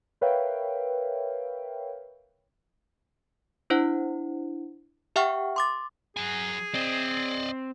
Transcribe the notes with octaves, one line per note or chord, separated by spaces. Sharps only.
A#4 B4 C#5 E5 F5 G5
D4 E4 C5 F#5
G4 E5 F#5 G5 C#6 F6
C6 D6 A6
F#3 G#4 G#5
C4 D5 D#5